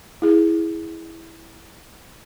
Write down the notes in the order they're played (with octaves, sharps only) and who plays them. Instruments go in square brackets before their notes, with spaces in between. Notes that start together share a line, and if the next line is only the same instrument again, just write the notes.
[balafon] E4 G#4